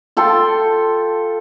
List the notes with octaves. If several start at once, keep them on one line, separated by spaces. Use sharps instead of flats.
F4 A4 G5 C6